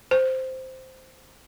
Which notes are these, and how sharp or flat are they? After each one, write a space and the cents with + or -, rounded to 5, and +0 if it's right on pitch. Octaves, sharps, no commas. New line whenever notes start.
C5 -5